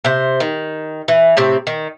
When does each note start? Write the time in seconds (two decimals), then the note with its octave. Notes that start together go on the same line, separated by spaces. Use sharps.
0.05 C3 C5
0.40 D#3
1.08 E3
1.37 A2 C3 C4
1.67 D#3